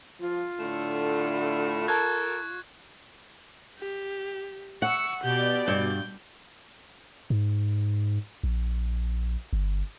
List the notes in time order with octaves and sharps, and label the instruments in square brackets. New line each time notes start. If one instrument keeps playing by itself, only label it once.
[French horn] F3 [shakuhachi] F4
[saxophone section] A2 A3 [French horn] D3
[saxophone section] A4 A#4 [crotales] C#6 F#6 G#6
[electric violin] G4
[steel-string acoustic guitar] F#5 [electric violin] C#6 E6
[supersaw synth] B2 D5 [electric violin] G4 G6
[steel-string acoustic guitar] G2 [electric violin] G6
[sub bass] G#2
A#1
G1